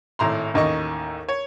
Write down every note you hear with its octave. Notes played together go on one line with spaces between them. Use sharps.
G#1 A2 A#5 C6
A1 D#2 D#4 D#5 C#6
C#5